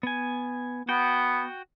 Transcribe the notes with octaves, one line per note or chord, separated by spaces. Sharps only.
B3 G#5
B3 F#4 G5